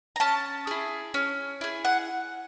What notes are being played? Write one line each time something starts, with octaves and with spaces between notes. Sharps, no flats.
A#5
C#4 A5
E4 G#4
C#4
E4 G#4
F#5